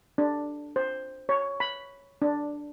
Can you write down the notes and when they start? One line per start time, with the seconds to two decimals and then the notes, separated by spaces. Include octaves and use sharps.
0.18 D4
0.76 C5
1.29 C#5
1.60 B5
2.22 D4